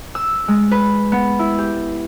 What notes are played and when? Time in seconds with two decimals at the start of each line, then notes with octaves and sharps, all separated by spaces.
0.15 E6
0.48 G#3
0.71 B4
1.12 B3
1.39 E4
1.58 G4